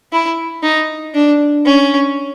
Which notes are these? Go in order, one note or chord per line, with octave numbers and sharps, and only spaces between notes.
E4
D#4
D4
C#4